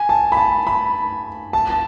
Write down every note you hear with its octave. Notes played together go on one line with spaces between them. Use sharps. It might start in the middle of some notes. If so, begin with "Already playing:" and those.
Already playing: G#5
A5
B5
A5
B5
A5
A5